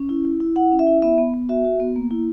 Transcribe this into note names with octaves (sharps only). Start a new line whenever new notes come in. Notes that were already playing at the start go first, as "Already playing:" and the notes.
Already playing: C#4
E4
E4
E4
E4 F#5
C#4
E5
E4
B3 E5
B3
B3
F#4 E5
F#4
B3
A#3
E4